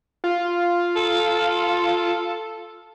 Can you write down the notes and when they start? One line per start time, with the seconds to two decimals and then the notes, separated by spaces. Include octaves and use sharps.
0.24 F4
0.96 A4